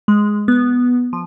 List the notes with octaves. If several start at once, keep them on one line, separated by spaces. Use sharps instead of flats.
G#3
B3
F3